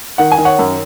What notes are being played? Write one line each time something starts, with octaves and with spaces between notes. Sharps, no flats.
D#3 F#5
G#5
D#3
C#5 F#5
F#2